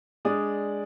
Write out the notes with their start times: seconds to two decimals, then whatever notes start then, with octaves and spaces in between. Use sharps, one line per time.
0.25 G#3 D4 D5 D#6